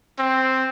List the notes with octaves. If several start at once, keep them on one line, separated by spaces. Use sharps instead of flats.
C4